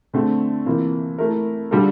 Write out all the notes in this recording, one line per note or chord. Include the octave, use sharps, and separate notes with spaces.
D3 A3 C4
C3 E3 A#3 F4
A3 E4 A#4
D3 G3 D4 F4 A4